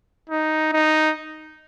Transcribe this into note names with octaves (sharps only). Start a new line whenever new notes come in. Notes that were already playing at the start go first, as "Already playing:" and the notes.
D#4
D#4